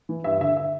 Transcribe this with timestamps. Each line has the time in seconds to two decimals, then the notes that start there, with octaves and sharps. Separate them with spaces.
0.09 E3
0.24 G2 E5
0.40 D3 E5
0.57 E5